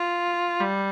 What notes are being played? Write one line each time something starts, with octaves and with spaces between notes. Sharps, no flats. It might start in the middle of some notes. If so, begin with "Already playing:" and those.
Already playing: F4
G3